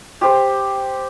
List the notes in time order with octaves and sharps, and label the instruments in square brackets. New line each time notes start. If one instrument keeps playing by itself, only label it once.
[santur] G4 C5